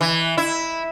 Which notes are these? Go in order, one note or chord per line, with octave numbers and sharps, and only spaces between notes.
E3
E4